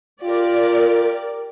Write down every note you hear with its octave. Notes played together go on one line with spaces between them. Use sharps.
F4 G4 A#4 D5